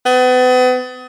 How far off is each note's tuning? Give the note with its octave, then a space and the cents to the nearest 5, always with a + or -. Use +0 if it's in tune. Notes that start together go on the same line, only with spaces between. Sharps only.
B3 +35